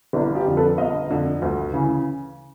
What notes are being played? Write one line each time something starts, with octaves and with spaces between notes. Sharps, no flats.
G1 D4 E4
F4 G4
F2 D3 F3
A4 B4
G1 D#5 F5
F2 D3 F3
D2
C#3 E3